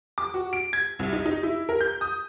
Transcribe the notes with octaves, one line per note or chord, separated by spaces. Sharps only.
D6
F#4
D7
G#6
C2
D#4
D#4
E4
A#4
G6
D#6